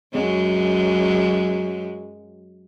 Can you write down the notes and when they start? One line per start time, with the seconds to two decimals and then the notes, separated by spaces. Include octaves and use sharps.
0.13 F#2 F#3 G#3